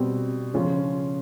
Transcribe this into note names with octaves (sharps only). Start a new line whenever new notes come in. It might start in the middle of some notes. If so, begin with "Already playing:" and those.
Already playing: B2 G3 C4
C#3 F3 G#3 C#4 F4